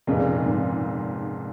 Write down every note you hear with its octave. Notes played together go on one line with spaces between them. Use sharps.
F1 F2 A#2 C#3 G#3
G#2